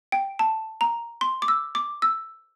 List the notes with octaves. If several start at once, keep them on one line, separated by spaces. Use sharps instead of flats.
G5
A5
A#5
C6
D6
E6
D6
E6